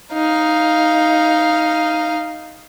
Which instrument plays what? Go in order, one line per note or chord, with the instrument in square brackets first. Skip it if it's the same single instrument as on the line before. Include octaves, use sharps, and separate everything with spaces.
[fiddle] D#4 F5